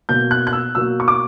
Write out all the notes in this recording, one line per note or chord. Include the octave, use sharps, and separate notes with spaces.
B2 F#3 A#3 G6
F#6
F#6
E6
B2 F#3 A#3 E6
C#6
D6